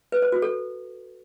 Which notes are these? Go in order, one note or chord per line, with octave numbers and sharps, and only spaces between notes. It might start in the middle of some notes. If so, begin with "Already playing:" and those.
B4
C5
F#4
A4